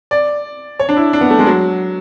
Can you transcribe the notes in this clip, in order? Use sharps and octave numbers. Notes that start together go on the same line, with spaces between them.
D5
C#5
D4
E4
D4
B3
A3
G#3
F#3